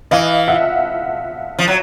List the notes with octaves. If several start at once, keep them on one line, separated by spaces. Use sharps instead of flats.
E3 D#5 F5
E5 F#5
F3
F#3